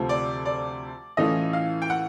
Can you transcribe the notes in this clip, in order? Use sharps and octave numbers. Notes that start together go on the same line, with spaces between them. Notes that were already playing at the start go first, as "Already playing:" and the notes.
Already playing: D2 C3 F3 A3
D5
D5
A2 E3 A3 C#4 F4 D#5
F5
G5
F#5